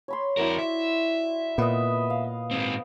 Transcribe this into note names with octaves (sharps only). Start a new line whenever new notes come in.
C#5 B5 C6
F2 E4 F#4 A#4 D5
E5
A#2 B3 D#5
F5
G#2 C4